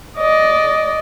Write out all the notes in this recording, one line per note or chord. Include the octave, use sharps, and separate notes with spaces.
D5 D#5